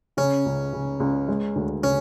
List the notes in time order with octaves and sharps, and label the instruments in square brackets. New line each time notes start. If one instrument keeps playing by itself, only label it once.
[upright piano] C#3 [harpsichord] C#4
[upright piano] C#2
C#3
C#2
G#3
D2
[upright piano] C#3 [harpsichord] C#4